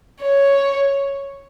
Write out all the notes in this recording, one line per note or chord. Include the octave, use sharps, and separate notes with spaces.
C#5